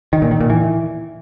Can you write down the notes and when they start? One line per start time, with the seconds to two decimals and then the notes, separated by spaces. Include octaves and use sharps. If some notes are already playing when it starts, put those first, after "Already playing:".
0.13 D#3
0.22 A#2
0.31 D#3
0.40 A#2
0.50 E3